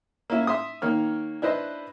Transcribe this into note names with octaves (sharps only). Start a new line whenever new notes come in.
A#3 C#4 E4 E5
E5 C6 D#6
D#3 A#3 C#5 F6
D4 E4 B4 C5 D#5